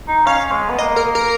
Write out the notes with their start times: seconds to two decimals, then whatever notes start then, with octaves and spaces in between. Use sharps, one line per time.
0.08 D#4
0.27 C#4 F5
0.52 G#3
0.69 B3
0.78 A#3 D#5
0.96 A#4
1.15 A#4